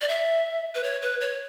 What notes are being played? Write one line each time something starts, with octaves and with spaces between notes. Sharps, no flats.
D5
E5
B4
C#5
B4
C#5